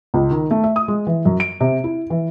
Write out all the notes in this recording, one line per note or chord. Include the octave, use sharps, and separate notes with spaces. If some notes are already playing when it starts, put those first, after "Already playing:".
C#2
D#3
A3
E5
D#6
G#3
E3
F#2
D7
C3
E4
E3